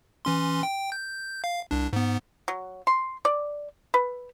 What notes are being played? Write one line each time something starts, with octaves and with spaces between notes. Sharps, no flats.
E3 C#4 C6
G5
G6
F5
C2 D4
G#2 B3
F#3
C6
D5
B4